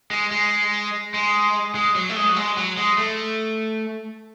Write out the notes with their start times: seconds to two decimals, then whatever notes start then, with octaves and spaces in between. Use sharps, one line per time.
0.11 G#3
0.31 G#3
1.14 G#3
1.75 G#3
1.95 F#3
2.10 A3
2.16 G#3
2.29 F#3
2.36 G#3
2.57 F#3
2.77 G#3
2.98 A3